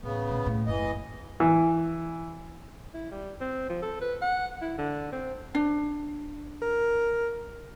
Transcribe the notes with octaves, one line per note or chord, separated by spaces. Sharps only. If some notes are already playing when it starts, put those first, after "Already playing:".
A1 C#3 B3
A#2
A2
F#1 E3 D#5
E3
E4
G3
C4
F3
A4
B4
F#5
E4
D3
C4
D4
A#4